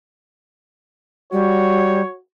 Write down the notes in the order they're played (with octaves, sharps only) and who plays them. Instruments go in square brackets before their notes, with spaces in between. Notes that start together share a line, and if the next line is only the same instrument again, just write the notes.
[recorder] G3 [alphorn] F#4 [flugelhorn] C#5